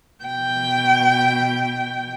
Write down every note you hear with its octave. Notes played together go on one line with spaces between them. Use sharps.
B2 G5